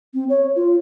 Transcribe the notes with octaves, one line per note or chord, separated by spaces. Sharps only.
C4
C#5
F4